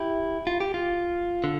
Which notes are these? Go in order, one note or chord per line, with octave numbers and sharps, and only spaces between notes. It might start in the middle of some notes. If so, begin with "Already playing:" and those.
Already playing: E4 G4
F4
G4
F4
D3